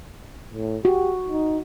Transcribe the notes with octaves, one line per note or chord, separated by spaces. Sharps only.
A2
F#4 G4
D#4